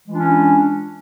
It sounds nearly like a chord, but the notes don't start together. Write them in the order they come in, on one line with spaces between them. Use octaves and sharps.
G#3 E3 F4 D4 C#4